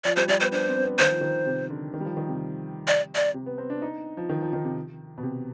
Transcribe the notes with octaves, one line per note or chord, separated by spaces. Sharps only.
F3 D5
G3 C5
G3 D5
B3 C5
D4 C5
C4
C4
B3
D#3 C5
F3
D#3
C3
D3
D#3
G3
F3
D#3
C3
D5
D5
C3
B3
C4
D4
D#4
F3
D#3
F3
D#3
C3
B2
C3